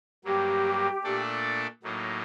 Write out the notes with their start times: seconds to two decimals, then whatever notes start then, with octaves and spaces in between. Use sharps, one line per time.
0.24 G2 F#3 A#3 G4
1.04 A#2 A3 D4 A4 D5
1.83 A2 F#3 A#3 D#4